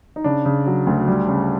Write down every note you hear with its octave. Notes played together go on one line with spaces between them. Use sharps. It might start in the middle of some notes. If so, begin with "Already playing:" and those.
D#4
C#3 D4
C#3
F#3
D2
G3
C#3